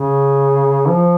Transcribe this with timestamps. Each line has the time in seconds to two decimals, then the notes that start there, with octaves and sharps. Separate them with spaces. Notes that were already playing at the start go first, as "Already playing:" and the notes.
Already playing: C#3
0.88 F3